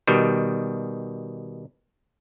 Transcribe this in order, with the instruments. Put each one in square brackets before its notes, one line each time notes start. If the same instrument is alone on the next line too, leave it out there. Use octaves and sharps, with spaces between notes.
[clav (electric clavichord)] B2 D#3 G3